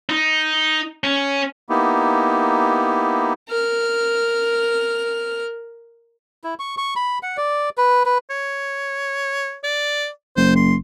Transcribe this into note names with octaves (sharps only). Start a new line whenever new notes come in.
D#4
C#4
A#3 B3 D#4 E4 G4
A#4 F6
E4
C#6
C#6
B5
F#5
D5
B4
B4
C#5
D5
F#1 C5
C6